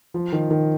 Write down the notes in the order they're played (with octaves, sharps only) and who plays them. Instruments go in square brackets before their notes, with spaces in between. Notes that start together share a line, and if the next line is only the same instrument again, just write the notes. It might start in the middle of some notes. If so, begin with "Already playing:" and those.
[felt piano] F3
D#3
D#3